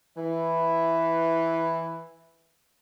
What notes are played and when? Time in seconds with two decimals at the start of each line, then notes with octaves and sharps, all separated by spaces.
0.17 E3 B4 E5